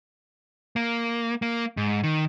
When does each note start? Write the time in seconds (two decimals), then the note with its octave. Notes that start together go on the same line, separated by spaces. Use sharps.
0.76 A#3
1.42 A#3
1.77 G#2
2.03 D#3